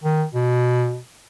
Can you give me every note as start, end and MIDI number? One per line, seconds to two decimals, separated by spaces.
0.04 0.24 51
0.34 0.97 47